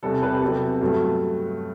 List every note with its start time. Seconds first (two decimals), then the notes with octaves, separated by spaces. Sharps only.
0.03 E2 C3 G3 B3 A4
0.23 B4
0.33 G4
0.42 C3 F#3 B3 A4
0.81 G2 F#3 A3